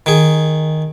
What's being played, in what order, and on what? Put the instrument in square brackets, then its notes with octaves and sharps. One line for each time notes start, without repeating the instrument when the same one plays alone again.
[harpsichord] D#3 G#4